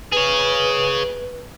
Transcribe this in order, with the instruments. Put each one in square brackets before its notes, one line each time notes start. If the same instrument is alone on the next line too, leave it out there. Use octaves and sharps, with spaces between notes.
[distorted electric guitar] G#4 C#5 [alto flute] B4